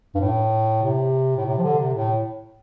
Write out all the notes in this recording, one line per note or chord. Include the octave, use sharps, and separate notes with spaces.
G2
A2
C3
A2
C3
F3
D3
C3
A2